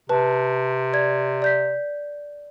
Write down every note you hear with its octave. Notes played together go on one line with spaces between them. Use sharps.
C3 B4 A5
D5 G#6
D5 G6 B6